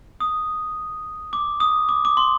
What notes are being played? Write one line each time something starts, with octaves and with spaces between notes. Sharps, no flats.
D#6
D6
D#6
D6
D6
C6